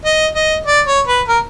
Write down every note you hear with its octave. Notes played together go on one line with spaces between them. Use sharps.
D#5
D#5
D5
C#5
B4
A#4